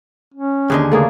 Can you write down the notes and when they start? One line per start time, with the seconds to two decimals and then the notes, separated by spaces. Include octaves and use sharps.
0.34 C#4
0.70 D#2 D3 G#4 D#5
0.92 C#3 A3 A#3 G#4